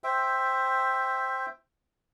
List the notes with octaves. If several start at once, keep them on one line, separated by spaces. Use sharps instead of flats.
C5 E5 G5